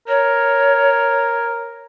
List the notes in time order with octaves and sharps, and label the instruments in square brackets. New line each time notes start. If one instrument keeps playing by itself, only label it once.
[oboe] A#4 [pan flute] C#5